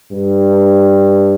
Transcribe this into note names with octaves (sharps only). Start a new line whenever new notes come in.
G2